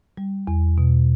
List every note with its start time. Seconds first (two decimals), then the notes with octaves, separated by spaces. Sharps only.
0.17 G3
0.47 E2
0.78 B2